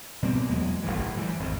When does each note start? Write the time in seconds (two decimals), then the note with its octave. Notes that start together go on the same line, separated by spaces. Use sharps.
0.23 B2 G3 A#3 C4
0.49 E2 B2 F#3 G#3
0.83 F1 B1 A2 E3
1.17 E3 G3
1.40 G#1 F2